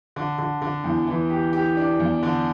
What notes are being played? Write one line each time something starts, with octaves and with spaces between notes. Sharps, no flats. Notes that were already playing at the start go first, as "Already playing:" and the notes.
D3
D3
D3
E2
E3
G4
G4
D4
E2
D3